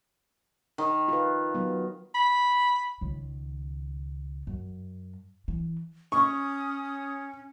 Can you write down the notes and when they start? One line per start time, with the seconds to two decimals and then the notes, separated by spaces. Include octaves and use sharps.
0.78 D#3
1.08 F4 B4
1.55 F#3 B3
2.15 B5
3.01 C#2 D#3
4.47 F#2
5.48 E3
6.12 C#4 C#6 D#6